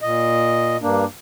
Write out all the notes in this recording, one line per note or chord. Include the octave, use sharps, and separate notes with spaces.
A#2 D#5
G2 A#3 D4